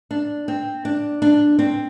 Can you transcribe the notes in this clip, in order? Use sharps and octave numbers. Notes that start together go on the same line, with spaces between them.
D4
C4
D4
D4
C4